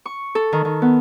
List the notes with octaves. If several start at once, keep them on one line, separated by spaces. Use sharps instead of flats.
C#6
A4
D#3
D#3
B3